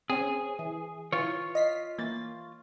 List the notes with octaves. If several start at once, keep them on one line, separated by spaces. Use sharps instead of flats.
C4 C#4 G#4
E3
E3 F4 C#5
D#5 B6 C7
E3 A#3 A6